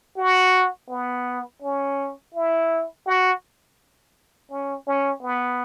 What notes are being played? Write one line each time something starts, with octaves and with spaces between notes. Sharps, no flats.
F#4
B3
C#4
E4
F#4
C#4
C#4
B3